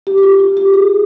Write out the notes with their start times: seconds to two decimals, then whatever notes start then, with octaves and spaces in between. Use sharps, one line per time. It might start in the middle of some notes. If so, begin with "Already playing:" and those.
0.07 G4
0.18 G4
0.23 F4
0.40 F4
0.57 G4
0.74 G#4